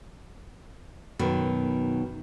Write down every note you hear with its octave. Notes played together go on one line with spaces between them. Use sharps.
F#2 B2 D#3